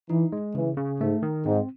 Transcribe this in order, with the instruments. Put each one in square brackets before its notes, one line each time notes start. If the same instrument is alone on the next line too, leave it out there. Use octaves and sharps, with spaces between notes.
[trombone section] E3 [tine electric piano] D#4
[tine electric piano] G#3
[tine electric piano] C#3 [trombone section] E3
[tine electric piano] C#3
[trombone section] G#2 [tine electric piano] A3
[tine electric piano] D#3
[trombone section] G#2 [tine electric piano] C4